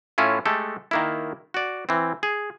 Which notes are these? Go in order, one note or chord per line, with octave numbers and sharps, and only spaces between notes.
A2 C#4 E4 F4
G#3 A3 G4 A4
D#3 A#3 E4
F#4 D5
E3 C4
G#4